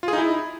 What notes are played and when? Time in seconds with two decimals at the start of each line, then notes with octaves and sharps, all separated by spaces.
0.03 F4
0.08 G#4
0.13 D#4
0.18 E4